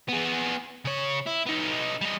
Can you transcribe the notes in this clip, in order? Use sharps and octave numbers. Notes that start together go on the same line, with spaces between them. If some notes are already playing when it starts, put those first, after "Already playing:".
B3 G#4
C#3 C#5
E4
B3 D#4
G3 D#5